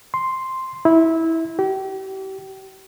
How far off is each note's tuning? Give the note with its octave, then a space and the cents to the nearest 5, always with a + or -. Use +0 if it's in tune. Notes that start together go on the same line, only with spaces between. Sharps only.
C6 +0
E4 -15
G4 -35